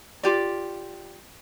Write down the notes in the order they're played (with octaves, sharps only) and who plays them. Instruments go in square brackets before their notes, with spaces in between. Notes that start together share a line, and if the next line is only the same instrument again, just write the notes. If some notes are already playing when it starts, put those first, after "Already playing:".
[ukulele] F4 G4 D5